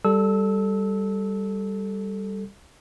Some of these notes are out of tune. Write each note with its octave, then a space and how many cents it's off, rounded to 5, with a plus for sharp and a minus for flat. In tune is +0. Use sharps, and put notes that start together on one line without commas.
G3 +0 A4 +0 E6 -25